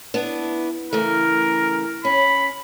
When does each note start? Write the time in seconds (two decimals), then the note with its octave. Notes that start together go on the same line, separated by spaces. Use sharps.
0.14 B3 D4 E4
0.93 C#3 E3 A3 A#4
2.05 C#4 B5